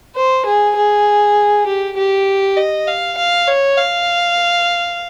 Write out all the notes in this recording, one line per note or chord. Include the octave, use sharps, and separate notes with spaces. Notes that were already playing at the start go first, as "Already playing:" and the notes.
C5
G#4
G#4
G4
G4
D#5
F5
F5
C#5
F5